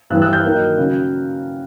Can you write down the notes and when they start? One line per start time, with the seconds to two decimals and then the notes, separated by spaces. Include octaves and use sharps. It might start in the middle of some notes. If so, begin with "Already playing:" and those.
0.10 G2 E3 G3 E6 F#6
0.22 E6 F#6
0.33 F6 G6
0.45 D#3 F#3 A#3 D#4
0.77 C#3 F#3